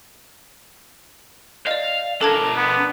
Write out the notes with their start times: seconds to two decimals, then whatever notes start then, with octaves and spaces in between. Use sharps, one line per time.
1.67 D5 D#5 F5
2.21 D4 A4 A#4 A5 G#6
2.56 B3